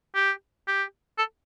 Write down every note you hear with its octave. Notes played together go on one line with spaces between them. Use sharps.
G4
G4
A4